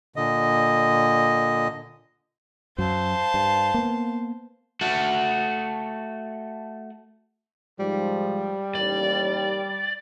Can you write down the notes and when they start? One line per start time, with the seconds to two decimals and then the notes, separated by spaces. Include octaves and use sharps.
0.16 A#2 D3 D#5
2.78 F#2 F#3 C5 F5 A5
3.34 G2
3.74 A#3 B3
4.81 A3 F#4
7.79 G#2 F3 G3
8.75 A1 D#2 G4 D5